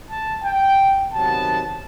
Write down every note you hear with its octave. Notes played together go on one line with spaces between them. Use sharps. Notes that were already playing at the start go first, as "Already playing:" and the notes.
A5
G5
C3 D#3 F#3 B3 A5